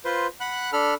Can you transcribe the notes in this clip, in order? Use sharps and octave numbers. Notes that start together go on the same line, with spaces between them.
F4 B4 C5
F#5 B5 F#6
D4 A4 B5 F6